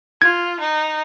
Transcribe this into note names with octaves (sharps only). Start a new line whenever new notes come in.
F4 G#6
D#4